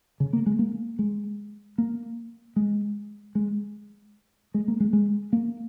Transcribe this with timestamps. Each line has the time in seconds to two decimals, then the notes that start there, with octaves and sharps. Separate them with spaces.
0.20 C#3
0.33 A#3
0.46 G#3
0.59 A#3
0.99 G#3
1.78 A#3
2.56 G#3
3.35 G#3
4.54 G#3
4.68 A#3
4.80 G#3
4.93 G#3
5.33 A#3